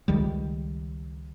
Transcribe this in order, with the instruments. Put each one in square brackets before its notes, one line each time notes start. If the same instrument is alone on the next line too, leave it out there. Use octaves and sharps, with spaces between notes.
[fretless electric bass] C#2 D#3 G3